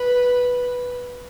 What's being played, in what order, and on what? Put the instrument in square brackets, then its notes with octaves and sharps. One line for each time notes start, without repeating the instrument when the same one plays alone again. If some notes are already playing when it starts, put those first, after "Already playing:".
Already playing: [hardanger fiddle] B4